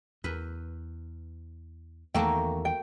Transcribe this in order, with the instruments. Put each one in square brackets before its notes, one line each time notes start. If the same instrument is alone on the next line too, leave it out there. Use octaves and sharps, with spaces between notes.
[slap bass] E2 [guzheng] B4
[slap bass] E2 D#3 [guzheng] A3 A#3 F#4 [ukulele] G5
[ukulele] G5